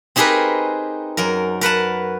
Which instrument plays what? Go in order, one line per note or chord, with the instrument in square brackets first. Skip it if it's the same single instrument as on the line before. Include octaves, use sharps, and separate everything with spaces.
[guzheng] C4 D#4 G4 G#4 A#4 B4
F#2 A#4
A#4 B4 F#5 A5